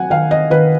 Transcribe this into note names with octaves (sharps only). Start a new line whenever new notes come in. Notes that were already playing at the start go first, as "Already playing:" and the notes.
Already playing: F#3 F#5 G#5
D#3 F5
D#5
D#3 B4